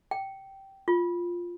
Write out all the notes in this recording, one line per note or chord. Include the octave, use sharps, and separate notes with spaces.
G5
F4